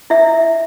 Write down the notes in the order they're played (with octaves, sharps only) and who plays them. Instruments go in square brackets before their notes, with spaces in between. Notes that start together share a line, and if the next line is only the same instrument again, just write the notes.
[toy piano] E4 E5